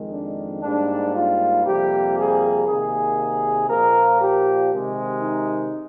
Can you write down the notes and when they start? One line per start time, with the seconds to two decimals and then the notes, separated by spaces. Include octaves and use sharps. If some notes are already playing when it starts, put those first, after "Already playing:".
Already playing: F2 D#3 G#3
0.12 D4
0.63 G#2 G3 A#3 D4
1.14 F4
1.65 F2 C3 G3 A#3 G4
2.16 G#4
2.67 C3 D#3 A#3 G#4
3.68 A#2 F3 A#3 A#4
4.20 G4
4.71 C3 D#3 G#3
5.22 D#4